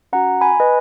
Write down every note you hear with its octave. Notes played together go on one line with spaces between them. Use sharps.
C#4 F#4 F#5 A#5
G#5 B5
B4 D#5